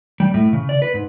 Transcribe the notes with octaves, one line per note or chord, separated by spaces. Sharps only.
G3
A2
C#3
D5
B4
G#2